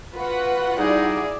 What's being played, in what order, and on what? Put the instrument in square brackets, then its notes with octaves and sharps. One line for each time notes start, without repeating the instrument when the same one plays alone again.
[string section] F4 F#4 F#5 [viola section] B4
[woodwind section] G3 D#4 [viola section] E4 D5 [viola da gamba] G#4